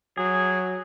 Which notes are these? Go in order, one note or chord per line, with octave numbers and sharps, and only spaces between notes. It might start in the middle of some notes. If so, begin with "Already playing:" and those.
F#3 G#4